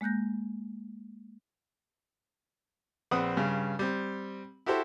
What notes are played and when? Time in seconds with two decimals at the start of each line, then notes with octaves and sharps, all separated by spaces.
0.01 G#3 A#3 F#6 G6 A#6
3.11 A#1 C4 B4 F#5 D#6
3.37 G2 C#3
3.79 G3 C4
4.66 E4 F#4 G4 A4 C5 E5